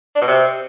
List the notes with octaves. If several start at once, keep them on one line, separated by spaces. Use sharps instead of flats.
D4
B2
C3